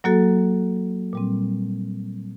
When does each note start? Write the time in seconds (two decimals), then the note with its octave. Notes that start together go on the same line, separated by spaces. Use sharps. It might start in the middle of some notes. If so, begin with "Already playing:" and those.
0.04 F#3 A#3 F#4 A4
1.13 A#2 G3 C4